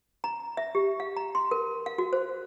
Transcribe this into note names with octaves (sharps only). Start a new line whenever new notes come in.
A#5
E5
G4
F5
A#5
C6
A#4
F5
F#4
C5